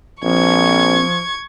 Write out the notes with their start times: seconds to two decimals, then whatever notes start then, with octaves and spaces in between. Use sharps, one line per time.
0.23 A#1 F3 C4 C#6 G#6